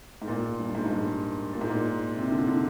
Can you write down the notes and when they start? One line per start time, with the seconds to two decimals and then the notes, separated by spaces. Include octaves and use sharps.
0.22 G#2
0.28 A#2
0.59 G2
0.75 G#2
0.85 G2
0.90 G#2
1.53 A#2
1.61 G#2
1.70 A#2
2.16 C3
2.31 D3
2.47 D3